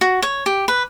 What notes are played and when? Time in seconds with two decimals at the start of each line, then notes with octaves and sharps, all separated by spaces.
0.01 F#4
0.22 C#5
0.46 G4
0.68 B4